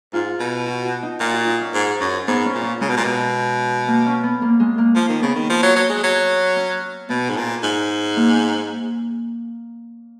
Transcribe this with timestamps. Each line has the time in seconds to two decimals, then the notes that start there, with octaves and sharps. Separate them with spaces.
0.13 G#2 F4
0.39 B2
0.66 F#4
0.85 F#4
1.03 D#4
1.20 A#2 F4
1.34 F#4
1.47 D#4
1.61 C#4
1.74 G#2
2.00 F#2
2.27 G#2 B3
2.45 C#4
2.54 A#2
2.63 C#4
2.80 C#3 G#3
2.89 B2
2.97 A#2
3.04 B2
3.88 A#3
4.06 C#4
4.23 B3
4.42 A#3
4.60 G#3
4.78 A#3
4.95 F3 A#3
5.08 D#3
5.22 C#3 B3
5.35 D#3
5.49 F3
5.62 F#3
5.76 F#3
5.89 G#3
6.03 F#3
6.56 C#4
7.09 B2 B3
7.29 G#2
7.37 A#2
7.63 G#2
8.17 A#3